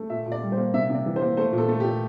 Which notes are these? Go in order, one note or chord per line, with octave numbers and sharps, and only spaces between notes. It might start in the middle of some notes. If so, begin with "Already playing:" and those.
Already playing: A3
A#2 E5
A#2
D5
G3
C5
A#3
C3 E5
C3 D5
E3
C5
A#3
A3 C5
A#2
A4
A3
G4
A#2